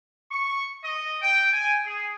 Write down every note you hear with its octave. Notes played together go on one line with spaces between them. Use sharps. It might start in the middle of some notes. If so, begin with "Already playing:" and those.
C#6
D#5
G5
G#5
G#4